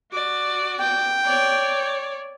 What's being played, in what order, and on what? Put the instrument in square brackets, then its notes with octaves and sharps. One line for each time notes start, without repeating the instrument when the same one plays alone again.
[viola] F#4 D5
[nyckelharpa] G5
[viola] C#5 D5